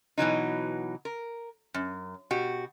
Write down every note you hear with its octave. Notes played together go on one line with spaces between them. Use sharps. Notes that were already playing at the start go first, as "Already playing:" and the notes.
B2 E3 F#3 D#4
A#4
F#2
B2 F#4 G4